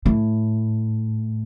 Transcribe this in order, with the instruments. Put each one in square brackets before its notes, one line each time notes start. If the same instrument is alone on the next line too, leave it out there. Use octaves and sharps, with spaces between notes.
[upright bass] A2